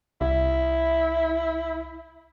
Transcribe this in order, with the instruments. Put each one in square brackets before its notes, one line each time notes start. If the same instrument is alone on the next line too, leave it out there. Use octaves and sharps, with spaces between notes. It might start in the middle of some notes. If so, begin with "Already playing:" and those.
[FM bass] C2 [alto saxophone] E4